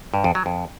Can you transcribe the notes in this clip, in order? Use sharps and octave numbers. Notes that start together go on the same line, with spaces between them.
G2
F2
F#3
F2